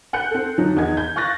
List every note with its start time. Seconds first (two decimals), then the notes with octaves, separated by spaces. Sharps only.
0.13 F#5 F#6 G6 C#7
0.31 C4 A4
0.58 F2 D3 D#3 F3 F#3 D#4
0.76 E2 D#3 D#5 G#6
0.97 G6
1.16 F5 C#6 F#6 A6 A#6